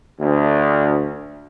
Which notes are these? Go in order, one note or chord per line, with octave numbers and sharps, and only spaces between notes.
D2